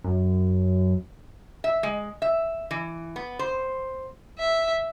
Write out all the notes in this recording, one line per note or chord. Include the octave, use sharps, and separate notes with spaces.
F#2
E5
G#3
E5
E3
B3
C5
E5